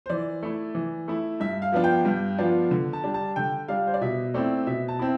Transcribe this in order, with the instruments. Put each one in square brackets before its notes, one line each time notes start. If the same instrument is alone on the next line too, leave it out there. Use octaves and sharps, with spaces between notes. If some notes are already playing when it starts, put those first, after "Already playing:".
[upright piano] C5
E3 D5
A3 E4
E3
A3 E4
G2 E5
F5
F3 B3 D4 F4
G5
G2
F3 B3 D4 F4
D3
A5
G3 D4
A5
D3 G5
G3 D4 F5
C5
D5
B2 E5
A3 C4 E4 D5
B2 E5
A5
C4 E4